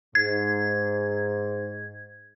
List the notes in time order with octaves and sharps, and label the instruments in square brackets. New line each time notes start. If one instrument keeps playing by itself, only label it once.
[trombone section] G#2 [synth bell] G#6